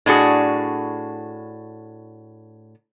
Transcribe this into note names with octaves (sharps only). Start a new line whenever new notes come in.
A2 D4 F#4 G#4